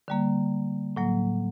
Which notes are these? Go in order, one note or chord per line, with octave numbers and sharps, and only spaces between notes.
D3 G3 A#3
A2 F#3 A#3